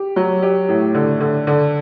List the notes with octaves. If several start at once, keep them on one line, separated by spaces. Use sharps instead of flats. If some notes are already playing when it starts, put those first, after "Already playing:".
Already playing: G4
F#3
G4
A2
D3
D3
D3